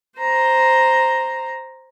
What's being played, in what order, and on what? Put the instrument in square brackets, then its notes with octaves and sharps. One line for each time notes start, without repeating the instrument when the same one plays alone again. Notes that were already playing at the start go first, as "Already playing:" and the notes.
[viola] C5 A#5